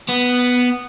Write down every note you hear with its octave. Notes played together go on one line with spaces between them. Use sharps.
B3